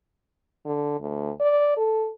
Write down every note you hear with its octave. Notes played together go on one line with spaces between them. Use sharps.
D3
D2
D5
A4